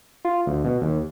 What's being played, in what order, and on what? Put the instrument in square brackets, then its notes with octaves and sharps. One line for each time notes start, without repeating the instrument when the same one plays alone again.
[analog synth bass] F4
D2
B2
D#2